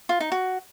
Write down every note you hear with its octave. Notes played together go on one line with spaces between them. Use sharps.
F4
D#4
F#4